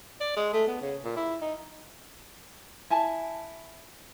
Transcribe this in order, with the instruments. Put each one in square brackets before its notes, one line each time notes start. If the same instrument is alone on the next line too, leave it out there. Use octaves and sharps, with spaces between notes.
[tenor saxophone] D5
G#3
A3
B3
C#3
A#2
E4
D#4
[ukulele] E4 G#5 A5